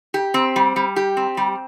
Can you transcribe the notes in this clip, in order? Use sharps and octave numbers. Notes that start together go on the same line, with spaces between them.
G4
C4
G3
G3
G4
C4
G3